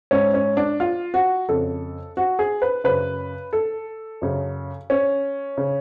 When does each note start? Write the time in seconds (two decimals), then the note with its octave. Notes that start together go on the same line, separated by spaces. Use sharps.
0.11 G#2 C#4
0.34 C#4
0.57 D4
0.80 F4
1.14 F#4
1.49 F2 C#3 A4
2.17 F#4
2.39 G#4
2.62 B4
2.84 F#2 C#3 B4
3.53 A4
4.22 F#2 C#3
4.90 C#4
5.58 C#3